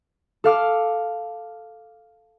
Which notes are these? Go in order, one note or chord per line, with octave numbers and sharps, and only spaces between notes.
A4 F5 D6 F6